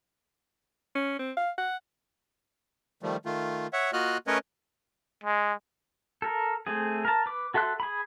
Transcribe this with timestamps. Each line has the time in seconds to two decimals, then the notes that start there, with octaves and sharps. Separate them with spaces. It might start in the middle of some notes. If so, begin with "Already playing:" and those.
0.95 C#4
1.19 C4
1.37 F5
1.58 F#5
3.03 D#3 F3 G3 A3
3.25 D#3 A3 F4
3.73 C#5 E5 F#5
3.93 A#3 F4 F#4 D#5 F6 F#6
4.27 A3 C#4 A#4 B4 C#5 D#5
5.24 G#3
6.22 A4 A#4
6.67 A3 C4 G#4
7.05 A#4 A5
7.26 B4 D6
7.54 F#4 A4 E5 C6 F#6
7.80 G#4 B5